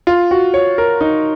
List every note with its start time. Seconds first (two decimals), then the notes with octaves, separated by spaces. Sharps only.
0.07 F4
0.31 F#4
0.54 C#5
0.78 A#4
1.01 D#4